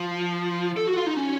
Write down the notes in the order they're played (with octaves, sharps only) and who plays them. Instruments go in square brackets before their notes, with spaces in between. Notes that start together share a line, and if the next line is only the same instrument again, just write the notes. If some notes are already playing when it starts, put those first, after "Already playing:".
Already playing: [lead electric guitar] F3
A4
F#4
F4
D#4
C#4